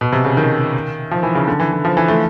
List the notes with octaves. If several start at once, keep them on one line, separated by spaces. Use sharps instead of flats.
B2
C3
C#3
D#3
F3
E3
C#3
D3
E3
E3
F3
E3
A3